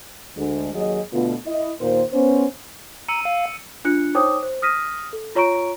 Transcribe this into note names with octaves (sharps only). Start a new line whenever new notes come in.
D2 D3 G#3
D#2 F#3 G#4 D#5
B2 D3 A3 B3 F4
E4 D#5
D#2 A#2 D#3 A#3 C5
B3 C#4 C5
A#5 E6 C#7 D#7
F5
D4 F4 F#6 C#7
D#4 C5 C#5 G5 D6 D#6
C5
D#6 F6 A#6 B6 D#7
A4
F4 C#5 A#5 C#6 D7